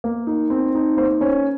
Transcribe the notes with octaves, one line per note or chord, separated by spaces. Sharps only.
A#3
D#4
C4
D#4
A#3 C5
C#4 C5